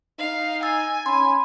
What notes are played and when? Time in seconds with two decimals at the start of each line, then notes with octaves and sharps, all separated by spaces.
0.19 D#4 F5
0.63 G#5 E6 A6
1.06 C#4 B5 C6